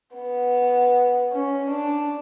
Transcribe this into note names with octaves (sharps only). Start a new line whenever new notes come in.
B3
C#4
D4